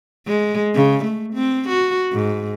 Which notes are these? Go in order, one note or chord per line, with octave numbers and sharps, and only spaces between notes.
G#3
C#3
A3
C4
F#4
G#2